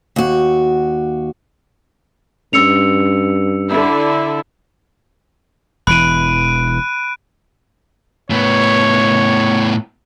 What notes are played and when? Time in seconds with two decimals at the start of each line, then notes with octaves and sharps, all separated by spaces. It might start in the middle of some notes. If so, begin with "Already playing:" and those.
0.16 D#2 F#4
2.53 G2 C#4 C5 E6 C#7 F7
3.69 D3 E4
5.87 E1 E3 B5 F#6 D7 D#7
8.30 A2 B3 C#5